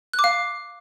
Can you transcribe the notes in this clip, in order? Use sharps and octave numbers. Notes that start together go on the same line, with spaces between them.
F#6
D6
F5